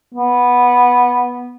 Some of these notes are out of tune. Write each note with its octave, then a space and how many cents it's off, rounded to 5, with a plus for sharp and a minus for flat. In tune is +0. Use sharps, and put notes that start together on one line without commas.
B3 -10